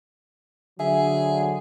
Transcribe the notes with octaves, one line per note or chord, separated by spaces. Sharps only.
D3 F#3 G#4 E5